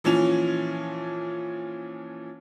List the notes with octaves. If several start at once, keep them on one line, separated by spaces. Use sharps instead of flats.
A#2 E3 F3 C#4 F7